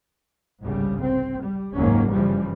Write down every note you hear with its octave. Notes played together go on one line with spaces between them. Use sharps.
G1 C2 G#2 C#3 G3
C4
G3
F#1 D#2 G#2 F#3 A#3 C#4
G2 C#3 E3 F3 G3